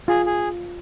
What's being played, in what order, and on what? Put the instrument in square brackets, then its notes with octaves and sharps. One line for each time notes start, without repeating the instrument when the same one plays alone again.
[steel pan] F4 [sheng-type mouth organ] G#4
[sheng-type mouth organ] G#4